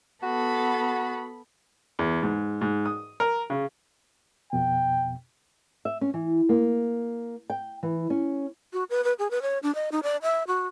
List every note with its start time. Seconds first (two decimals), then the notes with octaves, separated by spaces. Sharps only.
0.23 B3 F#4 A4 B5
1.99 E2
2.23 G#2
2.61 G#2
2.86 D#6
3.20 A#4
3.50 C#3
4.53 F2 B2 G5
5.85 E5
6.01 C#4
6.14 E3
6.49 A#3
7.50 G5
7.83 E3
8.10 C#4
8.73 F#4
8.90 B4
9.04 B4
9.19 G#4
9.31 B4
9.42 C#5
9.63 D4
9.75 D#5
9.92 D#4
10.03 D5
10.22 E5
10.47 F#4